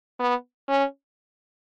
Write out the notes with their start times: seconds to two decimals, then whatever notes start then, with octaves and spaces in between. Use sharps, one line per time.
0.20 B3
0.69 C#4